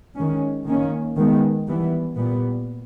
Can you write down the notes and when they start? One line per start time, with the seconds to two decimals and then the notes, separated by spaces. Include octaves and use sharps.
0.17 D#3 G#3 C#4
0.66 D#3 A#3 C#4
1.17 D#3 G#3 B3
1.67 E3 G3 B3
2.16 A#2 G3 B3